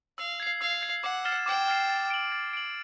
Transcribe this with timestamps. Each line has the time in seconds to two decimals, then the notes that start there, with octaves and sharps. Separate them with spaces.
0.18 F5 E6
0.40 G#6 C7
0.61 F5 E6
0.82 G#6 C7
1.04 F#5 D6
1.25 F6 A6 C7 E7
1.46 G5 D6
1.68 F6 A6 C7 E7
1.90 A6
2.10 D7 F#7
2.32 A6
2.53 D7 F#7